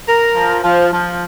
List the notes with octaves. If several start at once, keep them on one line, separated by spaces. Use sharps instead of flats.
A#4
F3
F3
F3